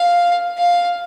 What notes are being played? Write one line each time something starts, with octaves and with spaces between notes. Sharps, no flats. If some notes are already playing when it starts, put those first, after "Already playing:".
Already playing: F5
F5